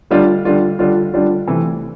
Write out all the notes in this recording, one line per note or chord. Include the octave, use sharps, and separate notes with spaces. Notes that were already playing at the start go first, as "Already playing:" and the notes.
D3 G3 D4 F4
D3 G3 D4 F4
D3 G3 D4 F4
D3 G3 D4 F4
C3 E3 A3